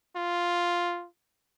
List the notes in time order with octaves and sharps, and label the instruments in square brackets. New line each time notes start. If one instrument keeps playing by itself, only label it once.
[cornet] F4